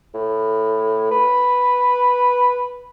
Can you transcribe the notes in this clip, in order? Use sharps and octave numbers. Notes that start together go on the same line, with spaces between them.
A2
B4